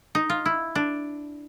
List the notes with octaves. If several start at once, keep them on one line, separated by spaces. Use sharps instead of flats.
D#4
F4
E4
D4